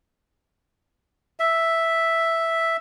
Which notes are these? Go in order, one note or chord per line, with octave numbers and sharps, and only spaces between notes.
E5